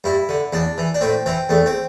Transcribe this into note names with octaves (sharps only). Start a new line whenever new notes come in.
G2 E4
D3
E2 D4
E3
D4
A2 C4
E3 C4
E2 A3
C4